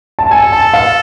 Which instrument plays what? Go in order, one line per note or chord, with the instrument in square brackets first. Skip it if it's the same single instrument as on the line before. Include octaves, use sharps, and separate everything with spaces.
[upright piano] A5
[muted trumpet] A4 [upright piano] G#5
[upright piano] A5
F5